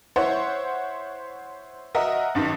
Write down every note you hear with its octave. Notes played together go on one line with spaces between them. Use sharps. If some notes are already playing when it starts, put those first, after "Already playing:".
E4 C5 C#5 F#5
F#4 A#4 D#5 E5 F#5
G#1 G2 D#3